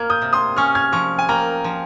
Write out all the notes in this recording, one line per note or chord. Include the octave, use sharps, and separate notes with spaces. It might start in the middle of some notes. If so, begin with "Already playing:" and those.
Already playing: A#3 F6 G#6
D#6 G6
C3
C6 D#6
C#4 C#6 F6
F6 G#6
F3 C#6 F6
G#5
A#3 G5 A#5
F3